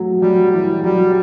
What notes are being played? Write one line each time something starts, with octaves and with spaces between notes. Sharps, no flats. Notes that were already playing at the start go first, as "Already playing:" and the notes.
Already playing: F#3 A3
F#3 G3
E3 G3
F#3 G3